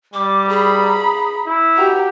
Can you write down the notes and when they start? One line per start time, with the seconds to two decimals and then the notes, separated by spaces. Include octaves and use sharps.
0.14 G3 D6
0.49 G#4 A#5 B5
1.47 E4
1.76 F#4 G4 A#5